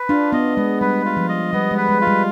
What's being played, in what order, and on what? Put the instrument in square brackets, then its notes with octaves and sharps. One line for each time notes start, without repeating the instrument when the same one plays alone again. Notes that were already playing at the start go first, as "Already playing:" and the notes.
Already playing: [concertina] B4
[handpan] D4 [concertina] F4
[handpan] B3 [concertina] D#5
[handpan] G#3 [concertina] B3
[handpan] G3 [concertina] B4
[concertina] F4
[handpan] F3
[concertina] D#5
[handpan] G3 [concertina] B3
[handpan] G#3
[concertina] B4
[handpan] G#3
[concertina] F4
[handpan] G3